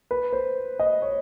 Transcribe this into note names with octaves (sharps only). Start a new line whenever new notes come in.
B4
C5
D#5
C#5